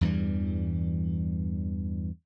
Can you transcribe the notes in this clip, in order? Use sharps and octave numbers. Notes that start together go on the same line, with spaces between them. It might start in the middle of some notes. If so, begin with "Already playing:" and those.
E2 G2 E3 G3